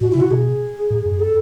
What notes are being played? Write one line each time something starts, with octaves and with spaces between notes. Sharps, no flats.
A2 F#4
C#3 E4
F#4
B2 G#4
A2
F#2
A4